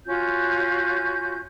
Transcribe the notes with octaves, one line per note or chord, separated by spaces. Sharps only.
C#4 F4 F#4 G6